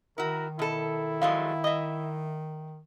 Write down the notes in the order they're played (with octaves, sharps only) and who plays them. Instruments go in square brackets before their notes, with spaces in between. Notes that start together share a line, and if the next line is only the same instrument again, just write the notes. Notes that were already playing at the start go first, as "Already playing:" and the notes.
[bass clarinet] D#3 [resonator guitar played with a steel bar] E4 F#4 [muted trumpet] A#4
[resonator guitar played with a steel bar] B2 A4 [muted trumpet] E4
[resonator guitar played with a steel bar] F3 F#3 G#3 [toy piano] F5
[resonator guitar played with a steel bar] D#5 E5 [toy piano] D#6